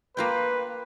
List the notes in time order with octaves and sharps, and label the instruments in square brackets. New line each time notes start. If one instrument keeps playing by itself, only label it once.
[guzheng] A#3 F4 G5 [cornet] B4